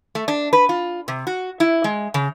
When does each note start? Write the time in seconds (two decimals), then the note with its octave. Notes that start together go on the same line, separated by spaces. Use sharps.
0.15 A3
0.28 D4
0.53 B4
0.69 F4
1.08 C3
1.27 F#4
1.60 E4
1.84 G#3
2.14 C#3